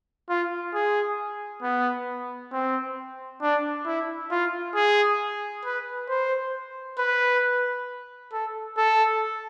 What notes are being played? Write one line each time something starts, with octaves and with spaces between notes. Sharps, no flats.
F4
G#4
B3
C4
D4
E4
F4
G#4
B4
C5
B4
A4
A4